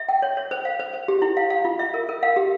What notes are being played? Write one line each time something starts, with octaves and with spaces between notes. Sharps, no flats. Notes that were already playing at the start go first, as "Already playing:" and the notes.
Already playing: E5
G5
C#5
C#5
C5
F5
C5
C5
G4
E4
F5
F5
F4
E5
A#4
A#4
F5
G4